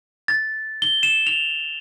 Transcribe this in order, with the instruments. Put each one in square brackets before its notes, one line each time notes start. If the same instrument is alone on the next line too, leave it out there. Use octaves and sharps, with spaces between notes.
[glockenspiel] A6
G7
E7
F7